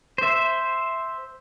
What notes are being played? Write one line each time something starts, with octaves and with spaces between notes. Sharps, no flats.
C5 E5